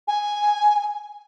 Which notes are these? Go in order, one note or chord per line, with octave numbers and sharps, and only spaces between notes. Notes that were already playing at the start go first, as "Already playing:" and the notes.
G#5